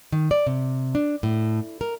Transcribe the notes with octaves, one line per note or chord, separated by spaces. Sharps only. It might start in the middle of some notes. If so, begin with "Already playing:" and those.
D#3
D5
C3
D4
A2
A#4